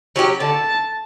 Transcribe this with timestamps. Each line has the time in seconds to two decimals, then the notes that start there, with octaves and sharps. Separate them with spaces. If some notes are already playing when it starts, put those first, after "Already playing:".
0.16 F#3 C#4 G4
0.40 D3 A5